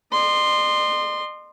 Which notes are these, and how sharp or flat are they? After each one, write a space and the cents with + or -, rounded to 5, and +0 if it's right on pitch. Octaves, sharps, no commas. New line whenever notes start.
D#5 -45 C6 +0